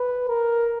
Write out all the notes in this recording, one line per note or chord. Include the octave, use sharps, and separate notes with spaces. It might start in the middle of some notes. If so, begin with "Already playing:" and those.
Already playing: B4
A#4